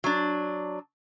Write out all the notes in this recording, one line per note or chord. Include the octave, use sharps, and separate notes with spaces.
F#3 D4